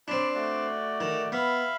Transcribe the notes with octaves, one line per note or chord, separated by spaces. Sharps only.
C4 D4 D5 B5
A3 F#4 D5
D#3
B3 E5 F5 B5